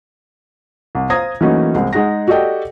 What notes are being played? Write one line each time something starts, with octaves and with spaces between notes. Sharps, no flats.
C2
C5 F5 A#5 D#6 G#6 A#6
E3 F#3 A3 A#3 C#4 D#4
C2 G#3 C4
G#3 D#4 G#4 F#5 A#6
F#4 G4 A4 D5 D#5 G5